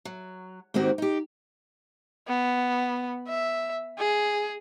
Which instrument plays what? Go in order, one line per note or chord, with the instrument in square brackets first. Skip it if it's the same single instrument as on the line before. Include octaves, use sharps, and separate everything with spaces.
[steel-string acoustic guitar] F#3
G#2 D#3 A#3 C4 F#4 G4
D#4 G4
[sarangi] B3
E5
G#4